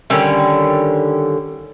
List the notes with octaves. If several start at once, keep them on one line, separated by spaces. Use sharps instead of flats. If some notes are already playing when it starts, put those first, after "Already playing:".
D3 D#3 G3 C#4